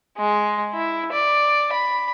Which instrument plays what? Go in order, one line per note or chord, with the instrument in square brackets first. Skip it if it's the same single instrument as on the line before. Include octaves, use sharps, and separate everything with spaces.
[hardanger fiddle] G#3
E4
D5
B5